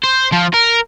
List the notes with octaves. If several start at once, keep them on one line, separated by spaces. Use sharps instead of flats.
C5
F3
A#4